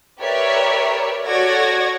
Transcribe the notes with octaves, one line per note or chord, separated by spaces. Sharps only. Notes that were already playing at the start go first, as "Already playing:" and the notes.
G4 A#4 B4 C#5 D5 E5
F#4 A4 C#5 D5 G#6 A#6